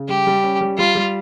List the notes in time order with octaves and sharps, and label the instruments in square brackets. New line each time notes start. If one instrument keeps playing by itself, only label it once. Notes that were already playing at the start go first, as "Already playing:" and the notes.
Already playing: [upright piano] C#3
[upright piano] G3 [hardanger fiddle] G4
[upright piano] G3
C#4
G3
[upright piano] G3 [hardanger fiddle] F4
[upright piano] G3